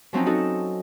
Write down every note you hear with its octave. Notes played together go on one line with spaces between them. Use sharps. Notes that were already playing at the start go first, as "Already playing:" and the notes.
F3 F#3 C4 C#4 D#4
D#4 F#4 A4